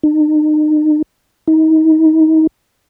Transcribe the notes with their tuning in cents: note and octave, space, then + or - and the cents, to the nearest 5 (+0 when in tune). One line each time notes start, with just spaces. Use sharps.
D#4 -35
D#4 +30